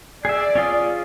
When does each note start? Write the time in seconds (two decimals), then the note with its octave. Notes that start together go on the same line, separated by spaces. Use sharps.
0.25 G#4 D5 E5
0.55 C#4 F4 G#4